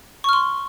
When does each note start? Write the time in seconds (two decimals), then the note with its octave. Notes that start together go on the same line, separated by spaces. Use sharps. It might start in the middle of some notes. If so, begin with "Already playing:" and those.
0.24 C#6
0.29 F6
0.33 C6